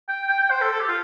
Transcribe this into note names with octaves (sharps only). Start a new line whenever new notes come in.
G5
G5
G5
C5
A4
A4
G4
F4